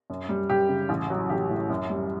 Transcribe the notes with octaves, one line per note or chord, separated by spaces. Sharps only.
F#2
G3
F#2 G4
C#3
A1
F#3
A1 G4
A2
F#2
G3